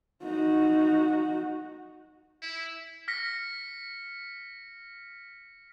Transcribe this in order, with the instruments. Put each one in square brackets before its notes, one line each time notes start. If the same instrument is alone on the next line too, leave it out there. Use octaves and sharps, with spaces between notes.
[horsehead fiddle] D#4 F#4
[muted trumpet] E4
[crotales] F6 A#6 B6 C#7